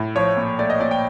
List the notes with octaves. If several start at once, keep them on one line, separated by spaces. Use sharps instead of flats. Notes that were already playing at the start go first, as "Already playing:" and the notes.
Already playing: A2
F3 C#5
A#2
A3 D5
D#5
A#2 D5
G5